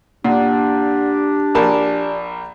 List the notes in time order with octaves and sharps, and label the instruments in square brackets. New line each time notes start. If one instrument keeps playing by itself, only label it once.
[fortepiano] A#2 [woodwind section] D4 G4 [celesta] F#5
[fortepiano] A#1 A#4 A5 [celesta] D5 G#5